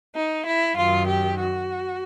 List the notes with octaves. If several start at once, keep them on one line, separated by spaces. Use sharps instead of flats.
D#4
E4
F#2 D#3 F#3 F4
G4
F#4